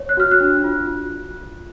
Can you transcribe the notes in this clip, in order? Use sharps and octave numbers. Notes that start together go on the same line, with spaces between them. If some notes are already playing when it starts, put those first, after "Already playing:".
Already playing: C#5
F#6
F#4 F6
F#6
D4
F4
F4